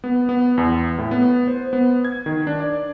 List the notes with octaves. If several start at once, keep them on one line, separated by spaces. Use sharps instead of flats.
B3
B3
E2
A2
B3
C5
B3
G#6
D#3
D4
D5